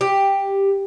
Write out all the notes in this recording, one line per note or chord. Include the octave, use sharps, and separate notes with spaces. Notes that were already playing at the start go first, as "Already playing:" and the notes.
G4